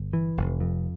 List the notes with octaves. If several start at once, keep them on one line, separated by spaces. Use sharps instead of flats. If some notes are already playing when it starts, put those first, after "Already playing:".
Already playing: G1
E3
F1
F2